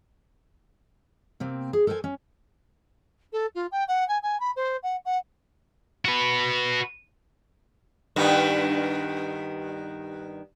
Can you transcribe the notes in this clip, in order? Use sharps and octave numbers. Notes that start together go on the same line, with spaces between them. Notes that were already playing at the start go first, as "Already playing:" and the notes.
C3 A#3 C4
G#4
A4 A#4 C5 G5 G#5
C#4
A4
F4
G5
F#5
G#5
G#5
B5
C5
F#5
F#5
F#4 B4
G2 D#3 B3